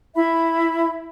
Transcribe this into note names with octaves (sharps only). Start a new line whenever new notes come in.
E4 E5 B5